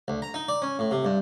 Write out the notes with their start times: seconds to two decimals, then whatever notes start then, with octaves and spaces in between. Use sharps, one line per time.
0.08 D2
0.22 A#5
0.34 D#4
0.48 D5
0.62 C#4
0.79 A2
0.91 C3
1.05 G2